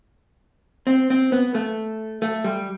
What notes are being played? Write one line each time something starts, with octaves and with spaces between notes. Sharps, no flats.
C4
C4
B3
A3
A3
G3